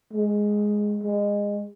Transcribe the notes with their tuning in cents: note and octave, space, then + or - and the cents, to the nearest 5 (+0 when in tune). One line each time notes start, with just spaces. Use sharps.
G#3 +0
G#3 -25